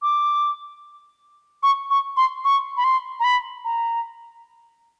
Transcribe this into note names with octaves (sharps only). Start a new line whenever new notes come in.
D6
C#6
C#6
C6
C#6
B5
C6
A#5
B5
A#5